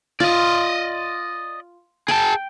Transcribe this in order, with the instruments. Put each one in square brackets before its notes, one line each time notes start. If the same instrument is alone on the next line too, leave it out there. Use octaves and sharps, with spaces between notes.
[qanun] F4 [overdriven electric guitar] D5 D#5
[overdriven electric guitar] G#4 A5 [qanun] G5